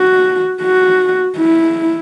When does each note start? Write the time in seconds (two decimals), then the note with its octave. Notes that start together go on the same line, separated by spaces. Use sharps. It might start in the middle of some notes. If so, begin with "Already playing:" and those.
Already playing: F#4
0.62 F#4
1.38 E4